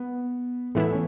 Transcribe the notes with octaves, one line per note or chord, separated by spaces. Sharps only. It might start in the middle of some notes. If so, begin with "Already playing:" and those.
Already playing: B3
A2 E3 A3 B3 E4
C#4